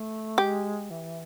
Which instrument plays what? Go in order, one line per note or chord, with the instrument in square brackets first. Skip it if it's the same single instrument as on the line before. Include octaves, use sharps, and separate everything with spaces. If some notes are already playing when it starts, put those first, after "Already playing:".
Already playing: [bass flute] A3
[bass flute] G#3 [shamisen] G4
[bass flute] E3